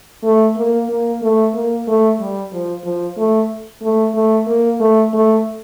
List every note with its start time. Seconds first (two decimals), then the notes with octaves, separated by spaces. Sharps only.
0.23 A3
0.57 A#3
0.89 A#3
1.22 A3
1.54 A#3
1.87 A3
2.20 G3
2.52 F3
2.84 F3
3.17 A3
3.82 A3
4.15 A3
4.47 A#3
4.80 A3
5.13 A3